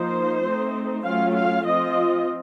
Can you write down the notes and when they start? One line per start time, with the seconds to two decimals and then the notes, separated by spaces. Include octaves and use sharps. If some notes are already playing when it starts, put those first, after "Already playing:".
Already playing: F3 A#3 D#4 C5
0.43 A3 C4 D#4
1.04 F#3 A3 C#4 F4 F5
1.35 F5
1.65 F3 C4 F4 D#5